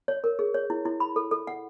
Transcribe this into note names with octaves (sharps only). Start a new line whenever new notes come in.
C#5
A#4
G#4
C#5
E4
E4
B5
A4
A4
F#5